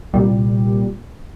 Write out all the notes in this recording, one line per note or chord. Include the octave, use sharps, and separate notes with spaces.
C2 A#2 G3